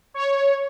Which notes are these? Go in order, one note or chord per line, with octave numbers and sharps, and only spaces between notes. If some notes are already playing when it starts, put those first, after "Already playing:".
C#5